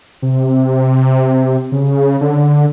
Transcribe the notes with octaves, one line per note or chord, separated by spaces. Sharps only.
C3
C#3
D3